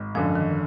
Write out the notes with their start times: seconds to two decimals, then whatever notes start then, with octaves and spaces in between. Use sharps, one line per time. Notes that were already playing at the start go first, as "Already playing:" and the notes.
Already playing: G#1
0.15 F#2 D3 F3
0.35 D#3